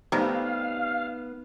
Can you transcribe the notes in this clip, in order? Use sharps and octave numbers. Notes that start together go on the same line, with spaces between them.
C3 D#3 G3 A3 B3 D#4 F5